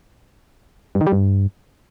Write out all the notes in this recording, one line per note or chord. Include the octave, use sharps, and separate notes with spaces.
G2
D#3
G3
G2